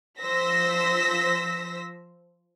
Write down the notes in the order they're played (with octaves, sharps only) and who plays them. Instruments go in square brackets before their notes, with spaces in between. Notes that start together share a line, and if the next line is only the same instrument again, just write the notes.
[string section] F3 C5 E6 A#6 B6